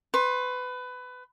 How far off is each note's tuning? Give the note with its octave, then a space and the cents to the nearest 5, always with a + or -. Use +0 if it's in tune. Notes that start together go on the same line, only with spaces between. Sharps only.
B4 +20 C6 +35